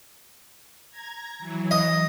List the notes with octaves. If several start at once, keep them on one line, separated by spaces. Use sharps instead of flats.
A#5 G#6
E3 F#3
D#5